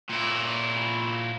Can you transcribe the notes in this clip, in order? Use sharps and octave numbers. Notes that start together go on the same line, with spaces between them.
A#2 E4